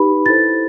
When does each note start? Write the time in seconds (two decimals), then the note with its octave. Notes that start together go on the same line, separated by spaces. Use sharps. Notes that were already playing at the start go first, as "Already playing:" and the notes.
Already playing: D#4 G4 B4 B5
0.26 E4 A4 C5 A6